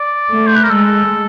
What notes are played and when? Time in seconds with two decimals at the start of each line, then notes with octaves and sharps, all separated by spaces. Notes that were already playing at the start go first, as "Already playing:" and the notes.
Already playing: D5
0.31 A3
0.47 C5
0.55 B4
0.63 A#4
0.70 G#3 A4